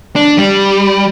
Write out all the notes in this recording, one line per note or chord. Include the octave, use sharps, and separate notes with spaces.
D4
G3